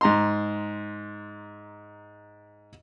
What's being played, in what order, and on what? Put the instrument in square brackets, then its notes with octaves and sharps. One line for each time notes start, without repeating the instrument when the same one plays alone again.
[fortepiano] G#2 A#5 C6